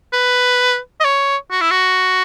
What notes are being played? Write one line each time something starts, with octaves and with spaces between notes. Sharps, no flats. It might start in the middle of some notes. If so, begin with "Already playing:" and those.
B4
D#5
C#5
F#4
E4
F#4